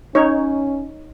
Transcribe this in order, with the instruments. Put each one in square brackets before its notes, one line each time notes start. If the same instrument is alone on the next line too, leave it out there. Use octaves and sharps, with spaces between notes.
[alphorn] C#4 [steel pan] D#4 C#5